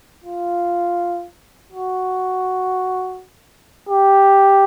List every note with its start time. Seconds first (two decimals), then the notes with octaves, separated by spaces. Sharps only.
0.24 F4
1.70 F#4
3.89 G4